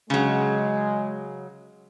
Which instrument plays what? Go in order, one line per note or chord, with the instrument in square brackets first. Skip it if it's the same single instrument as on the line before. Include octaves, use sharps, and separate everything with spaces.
[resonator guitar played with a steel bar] C#3 F#3 [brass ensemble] G#3